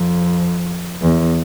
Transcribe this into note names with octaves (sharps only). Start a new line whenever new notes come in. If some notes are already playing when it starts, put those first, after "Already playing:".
Already playing: F2
E2